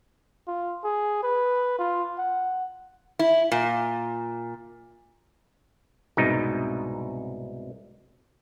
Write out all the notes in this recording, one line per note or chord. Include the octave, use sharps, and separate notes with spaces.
F4
G#4
B4
F4
F#5
E4
A#2
C2 G#2 B2 D#4